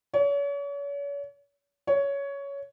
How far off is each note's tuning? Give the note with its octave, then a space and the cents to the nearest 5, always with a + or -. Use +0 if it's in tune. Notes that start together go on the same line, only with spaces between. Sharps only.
C#5 +40
C#5 +15